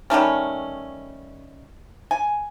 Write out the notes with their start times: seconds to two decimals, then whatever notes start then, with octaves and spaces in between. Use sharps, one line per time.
0.10 D#3 G3 A3 C#4
2.11 G#5